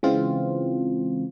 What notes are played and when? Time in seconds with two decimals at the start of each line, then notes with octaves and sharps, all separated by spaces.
0.03 C#3 E3 G#3 C4 F4